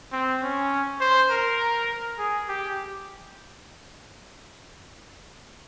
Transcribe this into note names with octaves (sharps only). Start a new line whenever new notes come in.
C4
C#4
C5
A#4
G#4
G4